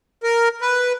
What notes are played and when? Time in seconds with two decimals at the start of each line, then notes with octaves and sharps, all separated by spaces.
0.23 A#4
0.61 B4